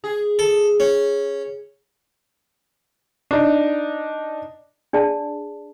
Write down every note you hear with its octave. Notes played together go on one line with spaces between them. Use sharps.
G#4
A4
C#4
D4 D#4
D4 G#4 D5 A5